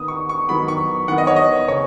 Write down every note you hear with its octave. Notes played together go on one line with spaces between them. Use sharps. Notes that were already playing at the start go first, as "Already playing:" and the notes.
Already playing: D#3 B3 D#6
C#6
C#6
D#3 F#3 B3 B5
C#6
D#3 B3 F#5
D#5
C#5
D#5
C#3 C#5